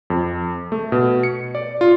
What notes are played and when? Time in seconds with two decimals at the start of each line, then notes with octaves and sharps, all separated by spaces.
0.10 F2
0.72 A3
0.92 B2
1.23 C#7
1.55 D5
1.81 F4